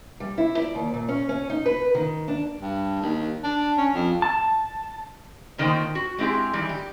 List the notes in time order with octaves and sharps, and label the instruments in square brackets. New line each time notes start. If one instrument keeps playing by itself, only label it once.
[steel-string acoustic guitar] G3
E4
D5
D#2
A#2
C#4
C#4
D#4
B4
D#3
D4
[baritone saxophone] G2
D#2
D4
C#4
F2
[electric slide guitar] A5
[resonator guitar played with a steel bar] A#2 D#3 A3 A#3 C5 G5
F#4
G#3 C4 E4 G4 G#4
D#3 E3 G3
G4